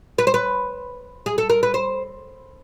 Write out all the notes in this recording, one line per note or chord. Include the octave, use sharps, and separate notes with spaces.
B4
C5
B4
G#4
A4
A#4
B4
C5